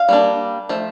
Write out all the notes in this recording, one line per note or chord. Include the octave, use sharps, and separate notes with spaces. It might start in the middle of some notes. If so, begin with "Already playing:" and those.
Already playing: F5
G3 A#3 D4
F3 A3